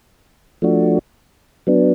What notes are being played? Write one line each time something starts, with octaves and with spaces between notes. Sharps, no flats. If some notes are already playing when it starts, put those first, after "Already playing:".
F3 A3 D4 F#4
F#3 B3 D4